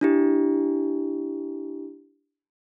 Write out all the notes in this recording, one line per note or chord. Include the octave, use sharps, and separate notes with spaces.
D4 E4 G4